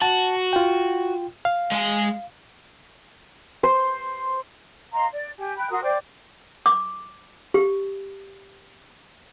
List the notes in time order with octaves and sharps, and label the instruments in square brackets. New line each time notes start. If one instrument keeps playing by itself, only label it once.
[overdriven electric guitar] F#4 [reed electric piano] A5
[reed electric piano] F4 G5
F5
[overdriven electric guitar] G#3 G#5
[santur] C5
[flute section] D#5 F5 A#5 C6
D5
G4 G#5
G5 B5 F#6
F#4 A#4 C6 D#6
C5 D5 G5 D6
[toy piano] D6
G4